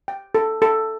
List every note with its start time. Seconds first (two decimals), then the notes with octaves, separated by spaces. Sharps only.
0.08 G5
0.35 A4
0.62 A4